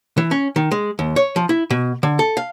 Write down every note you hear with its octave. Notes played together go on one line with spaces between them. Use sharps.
E3
C#4
D#3
G#3
D#2
C#5
F3
E4
B2
D3
A4
F5